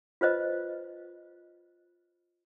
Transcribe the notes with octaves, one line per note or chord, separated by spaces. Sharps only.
F4 B4 C5 D#5